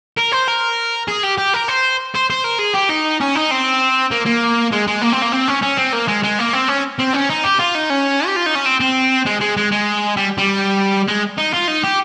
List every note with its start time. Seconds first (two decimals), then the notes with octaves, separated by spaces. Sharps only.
0.18 A#4
0.32 C5
0.48 A#4
1.08 G#4
1.24 G4
1.38 G4
1.54 A#4
1.68 C5
2.15 C5
2.30 C5
2.44 A#4
2.59 G#4
2.74 G4
2.90 D#4
3.21 C#4
3.35 D#4
3.51 C4
4.11 A#3
4.26 A#3
4.72 G#3
4.87 G#3
5.02 A#3
5.13 C4
5.22 A#3
5.32 C4
5.48 C#4
5.62 C#4
5.77 C4
5.92 A#3
6.08 G#3
6.23 G#3
6.39 A#3
6.53 C4
6.69 C#4
6.99 C4
7.14 C#4
7.30 D#4
7.44 G4
7.59 F4
7.75 D#4
7.90 C#4
8.26 G4
8.36 F4
8.46 D#4
8.55 C#4
8.66 C4
8.80 C4
9.26 G#3
9.41 G#3
9.57 G#3
9.71 G#3
10.17 G3
10.38 G3
11.08 G#3
11.37 D#4
11.53 F4
11.68 D#4
11.84 G4